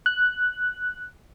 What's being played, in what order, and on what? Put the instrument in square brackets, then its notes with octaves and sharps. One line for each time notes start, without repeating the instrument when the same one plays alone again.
[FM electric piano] F#6